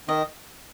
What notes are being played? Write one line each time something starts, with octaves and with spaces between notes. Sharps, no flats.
D#3 D#5